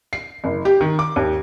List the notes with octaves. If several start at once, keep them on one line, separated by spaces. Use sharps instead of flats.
C7
F#1
G4
D#3
D6
D#2